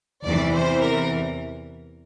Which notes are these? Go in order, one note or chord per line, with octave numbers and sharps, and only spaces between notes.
E2 C3 E3 D5
C5
A#4